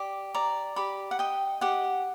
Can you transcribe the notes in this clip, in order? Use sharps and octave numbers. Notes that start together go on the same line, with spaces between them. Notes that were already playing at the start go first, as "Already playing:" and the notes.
Already playing: G4 D5 D6
D5 A#5
G4 B5
F#5
D#5 G5
G4 F#5